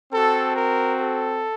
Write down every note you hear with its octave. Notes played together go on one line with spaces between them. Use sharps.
C4 F#4 A4
A#4
A4